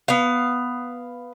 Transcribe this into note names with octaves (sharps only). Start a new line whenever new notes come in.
B3 F5